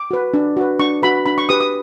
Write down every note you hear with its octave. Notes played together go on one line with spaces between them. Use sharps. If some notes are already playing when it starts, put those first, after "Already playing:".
Already playing: D6
F#4 B4
D4
F#4 B4
D4 C#6
F#4 B4 B5
D4 B5
C#6
G4 B4 D#6
D#6